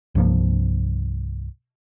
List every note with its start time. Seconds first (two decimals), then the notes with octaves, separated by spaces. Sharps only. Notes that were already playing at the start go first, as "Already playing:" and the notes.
0.15 C2 G2 F3 A#3